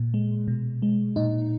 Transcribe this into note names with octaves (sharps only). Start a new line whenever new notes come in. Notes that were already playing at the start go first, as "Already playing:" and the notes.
Already playing: A#2
G#3
B2
G#3
A#2 D#4